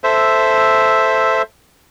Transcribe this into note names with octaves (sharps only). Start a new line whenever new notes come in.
A4 C5 E5